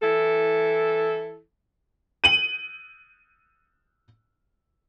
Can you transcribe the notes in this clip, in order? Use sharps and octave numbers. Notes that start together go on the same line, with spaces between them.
E3 E4 A4
D#7 F#7